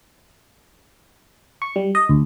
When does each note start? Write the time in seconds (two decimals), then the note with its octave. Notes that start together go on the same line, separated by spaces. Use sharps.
1.62 C#6
1.76 G3
1.95 D#5
2.09 D2